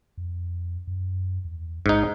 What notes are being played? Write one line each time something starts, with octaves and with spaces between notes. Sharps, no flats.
F2
F#2
E2
A1 G#2 D#4